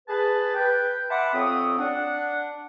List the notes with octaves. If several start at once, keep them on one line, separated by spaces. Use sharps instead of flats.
G#4 B4 A5
B4 G5
E5 F#5 A5 B5 C6 D6
F2 C4 C#5 D#6
D4 F#5